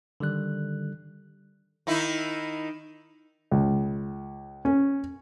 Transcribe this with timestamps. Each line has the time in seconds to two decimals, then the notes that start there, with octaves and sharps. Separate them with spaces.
0.20 D3 D#3 G3 F#6
1.87 D#3 D#4 E4
3.51 C#2
4.65 C#4